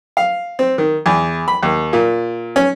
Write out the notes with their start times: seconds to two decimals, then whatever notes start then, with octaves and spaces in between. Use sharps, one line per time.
0.17 F5
0.59 C4
0.78 D#3
1.06 E2
1.48 B5
1.63 D#2
1.93 A#2
2.56 C#4